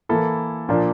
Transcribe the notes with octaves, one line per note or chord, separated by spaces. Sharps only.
E3 A#3 E4 A4
A#2 F3 A#3 D4